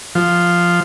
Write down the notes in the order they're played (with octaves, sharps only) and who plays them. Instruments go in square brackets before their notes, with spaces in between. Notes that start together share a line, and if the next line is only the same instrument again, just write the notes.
[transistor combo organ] F3